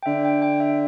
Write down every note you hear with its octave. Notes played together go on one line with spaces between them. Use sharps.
G5
D3 E5
G5
G5
E5